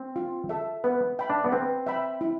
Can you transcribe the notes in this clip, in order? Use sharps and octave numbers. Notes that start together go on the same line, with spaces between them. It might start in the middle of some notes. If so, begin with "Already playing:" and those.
Already playing: C4
F4
A4 E5
B3 B4
E5 G5 B5
D4
B3
C4 B4
E5 G5 B5
E4